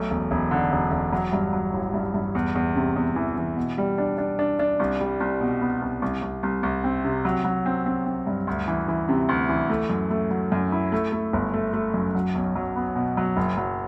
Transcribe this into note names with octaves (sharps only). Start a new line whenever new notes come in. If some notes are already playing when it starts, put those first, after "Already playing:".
Already playing: B1 A3
E1
E1
D3
E1
E1
F#3
G2
F#3
A1
G2
G2
E2
E2
C3
E2
E3
E3
B2
G3
D4
D4
D4
D4
C2
G3
C2
B2
B3
C2
C2
C2
C2
C2
C4
C3
F#3
F#3
C4
C4
C4
G2
D2
E3
E3
C3
D2
E3
A3
F#2
A3
F#3
F#2
E4
A3
A3
G1
A3
A3
F#2
F#3
B1
F#3
B3
B2
F#3
F#1
F#3